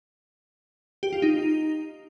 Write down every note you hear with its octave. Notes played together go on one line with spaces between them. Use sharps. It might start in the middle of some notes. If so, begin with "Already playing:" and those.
G4
F4
D#4